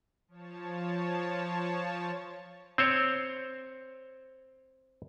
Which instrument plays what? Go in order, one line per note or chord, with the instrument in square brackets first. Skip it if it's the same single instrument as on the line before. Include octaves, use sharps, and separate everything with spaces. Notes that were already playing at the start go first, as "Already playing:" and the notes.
[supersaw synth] F3 C#5 A5
[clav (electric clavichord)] C4 C5 C#5